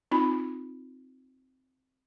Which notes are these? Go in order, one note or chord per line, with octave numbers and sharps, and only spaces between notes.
C4 D#4 F4 B5